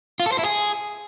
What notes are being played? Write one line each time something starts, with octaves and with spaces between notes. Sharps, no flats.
F4
A4
C5
E4
G#4